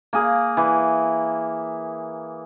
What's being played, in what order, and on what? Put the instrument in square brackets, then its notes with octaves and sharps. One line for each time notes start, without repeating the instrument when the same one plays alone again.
[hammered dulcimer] A#3 G#4
E3